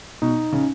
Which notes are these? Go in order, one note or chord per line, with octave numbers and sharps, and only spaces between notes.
B2 D#4
C#3